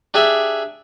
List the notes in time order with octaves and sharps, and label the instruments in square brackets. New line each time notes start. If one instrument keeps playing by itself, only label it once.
[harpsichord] D4 G4 G#4 D5 E5